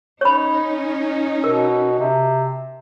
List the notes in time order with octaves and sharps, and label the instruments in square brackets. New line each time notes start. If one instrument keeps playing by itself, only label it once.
[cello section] C#4 D#4 [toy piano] C#5 B5
[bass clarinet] B2 [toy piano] A#4
[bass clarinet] C3